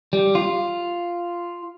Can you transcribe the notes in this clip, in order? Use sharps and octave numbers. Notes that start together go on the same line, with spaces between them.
G3
F4